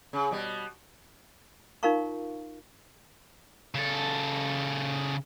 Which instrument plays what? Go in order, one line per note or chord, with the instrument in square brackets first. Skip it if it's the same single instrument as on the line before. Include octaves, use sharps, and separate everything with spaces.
[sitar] C#3
B2 G3
[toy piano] D#4 F4 A#4 F5 A#5 C#6
[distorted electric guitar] C#3 A4